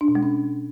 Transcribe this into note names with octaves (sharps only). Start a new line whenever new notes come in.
D4
B2
G#3
C#4